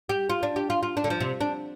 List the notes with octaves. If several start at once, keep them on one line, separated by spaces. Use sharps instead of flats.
G4
F4
D4
G4
F4
F4
D4
D3
F3
C3
D4